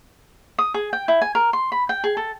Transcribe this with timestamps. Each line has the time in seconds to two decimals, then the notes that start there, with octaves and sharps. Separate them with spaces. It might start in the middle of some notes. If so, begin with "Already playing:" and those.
0.59 D#6
0.74 G#4
0.93 G5
1.08 E4
1.22 G#5
1.35 A#4
1.53 C6
1.72 B5
1.89 G5
2.04 G#4
2.17 A4